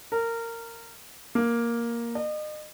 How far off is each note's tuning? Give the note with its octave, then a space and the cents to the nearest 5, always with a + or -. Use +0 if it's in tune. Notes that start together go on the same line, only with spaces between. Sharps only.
A#4 -20
A#3 +5
D#5 -40